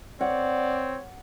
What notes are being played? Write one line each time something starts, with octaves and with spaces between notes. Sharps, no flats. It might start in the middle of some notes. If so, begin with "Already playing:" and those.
C4 C#5 D5 F#5